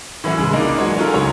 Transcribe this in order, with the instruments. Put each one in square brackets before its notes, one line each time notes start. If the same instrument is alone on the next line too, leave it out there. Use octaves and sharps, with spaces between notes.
[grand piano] A2 E3 F#3 C#4 E4 F#4
C2 C#3 E3 G#3
E3 A#3 D4 D#4 A#4 D#5
F#3 G#3 F#4 C#5
C#4 D#4 F4 F#4 A4 A#4
C#2 F#3 C#5 A#5